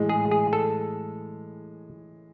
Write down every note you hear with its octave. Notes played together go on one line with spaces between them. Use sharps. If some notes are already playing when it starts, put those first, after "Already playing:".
Already playing: A2 E3 G#3
G#4
G#4
A4